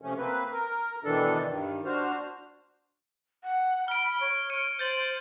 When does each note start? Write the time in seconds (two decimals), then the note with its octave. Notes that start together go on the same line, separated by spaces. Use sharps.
0.02 C3 F3 A3 C#4
0.18 A#3 C4 B4
0.51 A#4
1.04 B2 D#3 E3 D4 A4
1.47 G2 D#3
1.85 D4 F#4 C5 F6
3.43 F#5
3.88 B5 F6 D7
4.21 C#5
4.50 F6 C#7 D#7
4.79 C5 G6 A6 F#7